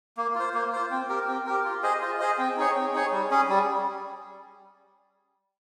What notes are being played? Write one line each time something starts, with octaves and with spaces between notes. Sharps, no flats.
A#3
F4 C5
A#3
F4 C5
C4
G4 A#4
C4
G4 A#4
F4
G#4 C5 D#5
F4
G#4 C5 D#5
C4
D#4 G#4 C#5
C4
D#4 G#4 C#5
G3
C#4 G#4
G3